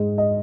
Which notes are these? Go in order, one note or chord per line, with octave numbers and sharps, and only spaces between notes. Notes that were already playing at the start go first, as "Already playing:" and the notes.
Already playing: G#2 G#3
D#5